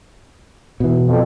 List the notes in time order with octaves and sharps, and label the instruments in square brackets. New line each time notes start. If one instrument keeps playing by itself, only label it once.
[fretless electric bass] B2 E3
[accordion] F2